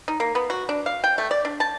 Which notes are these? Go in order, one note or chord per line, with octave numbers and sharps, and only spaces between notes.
D#4
A#3
B3
F#4
D4
F5
G5
A3
D5
D4
A5